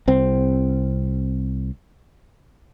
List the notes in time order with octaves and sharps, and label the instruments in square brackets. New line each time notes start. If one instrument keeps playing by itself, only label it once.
[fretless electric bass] C2 C4